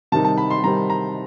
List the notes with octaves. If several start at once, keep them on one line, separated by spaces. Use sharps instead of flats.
C3 D#3 G3 C4 D#4 A5
A5
B5
C6
C3 D#3 G3 C4 D#4 A#5
A#5